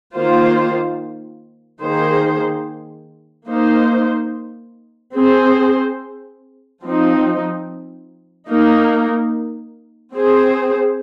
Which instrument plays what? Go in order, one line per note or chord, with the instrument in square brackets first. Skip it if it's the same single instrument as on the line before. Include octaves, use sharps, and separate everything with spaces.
[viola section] D#3 A#3 F4 C5
D#3 A#3 G#4 C5
A#3 D#4 C5
C4 G#4 C5
F3 C4 D#4
A#3 D#4 A#4
C4 G#4 C5